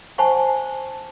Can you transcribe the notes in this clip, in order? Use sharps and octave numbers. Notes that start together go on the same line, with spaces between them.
C5 F#5 G#5 A5 B5 C#6